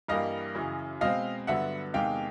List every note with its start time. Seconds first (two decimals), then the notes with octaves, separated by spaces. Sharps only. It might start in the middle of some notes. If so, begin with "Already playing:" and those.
0.08 G2 E3 G3 A#3 D#5 F5
0.55 F#2 C#3 E3
1.01 B2 G#3 C4 D#5 F5
1.47 G2 D3 F#3 B3 E5 F#5
1.94 E2 C3 D#3 G#3 F5 G5